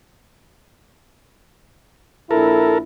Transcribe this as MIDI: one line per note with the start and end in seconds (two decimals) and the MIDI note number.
2.31 2.80 34
2.31 2.80 64
2.31 2.78 69
2.31 2.78 70